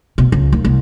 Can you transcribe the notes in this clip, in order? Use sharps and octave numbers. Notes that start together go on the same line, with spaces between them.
B2
C#2
D#2
C2